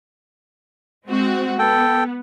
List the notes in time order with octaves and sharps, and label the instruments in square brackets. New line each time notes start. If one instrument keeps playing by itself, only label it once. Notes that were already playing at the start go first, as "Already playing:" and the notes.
[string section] G#3 C4 F#4
[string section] B3 [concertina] A4 G5